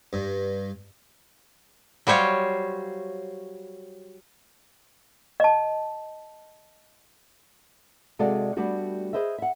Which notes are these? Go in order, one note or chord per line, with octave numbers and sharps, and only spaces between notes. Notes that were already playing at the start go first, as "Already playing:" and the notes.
G2
F#3 G3 C5 C#5 F5
D#5 A5
C3 G#3 F#4 A4 D5 F5
G3 A3 B3 D4 F#4 G4
G#4 B4 C5 D#5 E5
E5 F#5